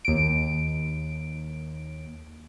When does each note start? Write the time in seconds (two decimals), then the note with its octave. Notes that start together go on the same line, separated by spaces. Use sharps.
0.05 D#2 D7